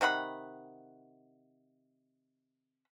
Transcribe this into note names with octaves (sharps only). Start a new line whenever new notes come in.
C3 D#3 F#5 B5